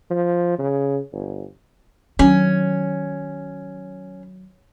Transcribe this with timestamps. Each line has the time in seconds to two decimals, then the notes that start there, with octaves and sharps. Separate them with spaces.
0.10 F3
0.59 C#3
1.13 G1
2.19 D#3 F#3 C#4